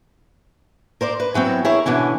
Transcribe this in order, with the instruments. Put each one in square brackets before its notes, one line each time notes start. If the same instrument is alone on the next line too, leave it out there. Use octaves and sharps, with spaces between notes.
[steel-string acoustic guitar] A#4 C5 D5
B4
E3 F#3 B3 C4
E4 G#4 A#4 C#5
B2 D3 E3 C#4